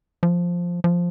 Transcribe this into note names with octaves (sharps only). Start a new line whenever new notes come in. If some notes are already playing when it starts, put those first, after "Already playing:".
F3
F3